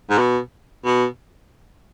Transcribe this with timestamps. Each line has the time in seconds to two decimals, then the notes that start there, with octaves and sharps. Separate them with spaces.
0.10 G#2
0.19 B2
0.85 B2